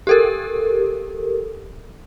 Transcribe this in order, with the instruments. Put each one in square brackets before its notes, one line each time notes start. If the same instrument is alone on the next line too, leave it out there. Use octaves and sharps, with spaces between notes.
[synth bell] G4 A4 A#4